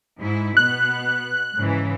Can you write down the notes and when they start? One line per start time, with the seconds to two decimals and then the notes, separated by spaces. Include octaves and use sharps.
0.18 G#2 E4
0.57 B2 B3 F#6
1.57 G#2 C#3 E3